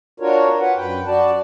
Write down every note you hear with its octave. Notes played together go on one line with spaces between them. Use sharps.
D4 F4 F#4 A#4 C#5
B4 F#5
F#2 B4 G5
F#4 D5 A5